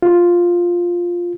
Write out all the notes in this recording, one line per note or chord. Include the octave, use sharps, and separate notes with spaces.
F4